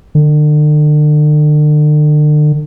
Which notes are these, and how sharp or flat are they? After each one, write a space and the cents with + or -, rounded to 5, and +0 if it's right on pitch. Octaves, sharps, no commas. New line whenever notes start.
D3 +40